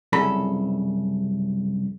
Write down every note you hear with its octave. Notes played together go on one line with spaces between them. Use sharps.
C2 F#2 C#3 A4 B5